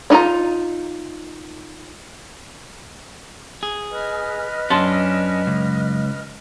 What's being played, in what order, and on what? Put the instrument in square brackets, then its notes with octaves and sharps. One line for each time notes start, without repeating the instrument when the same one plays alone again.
[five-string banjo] D4 D#4 F4 A#5
[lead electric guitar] G#4
[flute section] B4 D#5 F6
[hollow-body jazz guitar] F#2 A5 C6 [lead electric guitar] C#4 D4
[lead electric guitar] C#2